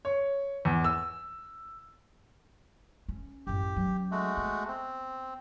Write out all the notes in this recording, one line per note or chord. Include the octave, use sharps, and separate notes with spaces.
C#5
E2
E6
C#4
A1 F#2 G4
F#3 C#4
G#3 A3 F#4
B3
C4